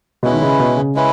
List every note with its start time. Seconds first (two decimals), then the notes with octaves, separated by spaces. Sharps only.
0.23 B2 G#3 C#4 E4 B4
0.33 D#3
0.42 C#3
0.60 B2
0.77 C#3
0.95 G#3 C#4 E4 B4